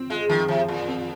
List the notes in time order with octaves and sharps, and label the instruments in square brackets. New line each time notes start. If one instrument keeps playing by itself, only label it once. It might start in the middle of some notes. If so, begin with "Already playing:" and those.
Already playing: [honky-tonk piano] C4
[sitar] G#3 [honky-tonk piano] F4
[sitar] D#3 [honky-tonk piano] F3
[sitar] C3 [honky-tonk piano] F3
[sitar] A#2 [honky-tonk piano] F4
[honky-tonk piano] C4